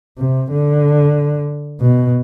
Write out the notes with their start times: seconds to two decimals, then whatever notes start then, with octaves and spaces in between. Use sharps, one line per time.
0.18 C3
0.51 D3
1.81 B2